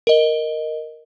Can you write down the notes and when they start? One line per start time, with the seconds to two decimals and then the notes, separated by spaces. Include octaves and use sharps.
0.07 A#4 D#5 G7